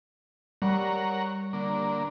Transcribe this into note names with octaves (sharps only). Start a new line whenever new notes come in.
G3 A#4 C#5 F#5
D3 A#3